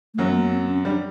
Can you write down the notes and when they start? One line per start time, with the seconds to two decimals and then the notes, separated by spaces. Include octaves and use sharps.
0.14 A3
0.18 F#2 F#3 A#3
0.30 B3
0.36 A3
0.41 A#3
0.52 C4
0.69 C#4
0.85 G3 D4